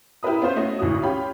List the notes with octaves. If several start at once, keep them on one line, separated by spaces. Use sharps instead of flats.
E4 G4 A#4 B4 B5 D#6
B3 C#4 F4 B4 C5
A3 C#4 F#4 D#5
G#1 D2 E3 F#4 D#6
C#4 F4 G4 B5